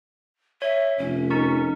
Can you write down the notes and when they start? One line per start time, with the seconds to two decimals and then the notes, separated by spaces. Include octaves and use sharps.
0.62 C#5 E5
0.98 F1 C#4
1.30 D#4 A#4 C#6